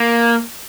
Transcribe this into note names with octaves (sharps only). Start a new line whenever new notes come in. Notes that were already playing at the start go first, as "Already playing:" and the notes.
Already playing: A#3